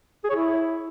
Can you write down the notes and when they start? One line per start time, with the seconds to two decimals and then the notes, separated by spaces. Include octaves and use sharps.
0.24 G#4
0.30 C#5
0.35 E4